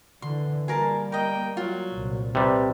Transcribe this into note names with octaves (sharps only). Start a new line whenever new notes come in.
D3 E3 C6
G3 A#3 G#4 A#4 A5
A#4 D#5 G5
F#3 F4
C2 A#2
C3 G3 B4